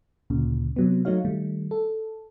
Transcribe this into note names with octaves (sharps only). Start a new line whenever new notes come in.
D2 A#2 C#3
C3 F#3 B3
F#3 A3 D#4 F#4 C#5 F5
D#3 G3 A3
A4